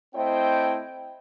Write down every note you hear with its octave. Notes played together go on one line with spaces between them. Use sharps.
A3 C4 E4 C5 D#5 G5